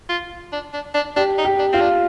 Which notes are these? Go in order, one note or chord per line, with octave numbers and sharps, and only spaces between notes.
F4
D4
D4
D4
D4 G4
D#4
G4
D4
C4 F4
D4